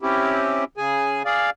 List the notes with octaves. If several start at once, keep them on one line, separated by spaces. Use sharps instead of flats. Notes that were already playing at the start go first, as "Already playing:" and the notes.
C4 C#4 E4 G4
C#3 G#4 G#5
G#4 D5 F5